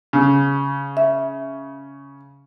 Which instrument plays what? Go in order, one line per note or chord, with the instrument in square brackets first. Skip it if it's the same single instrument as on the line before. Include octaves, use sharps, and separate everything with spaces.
[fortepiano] C#3
[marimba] E5